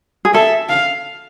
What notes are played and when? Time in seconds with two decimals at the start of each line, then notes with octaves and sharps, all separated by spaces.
0.25 G#4
0.34 A4 E5
0.69 F5